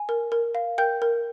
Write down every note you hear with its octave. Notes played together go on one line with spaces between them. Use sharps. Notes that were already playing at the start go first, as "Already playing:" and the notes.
Already playing: G#5
A#4
A#4
F5
A#4 G5 G6
A#4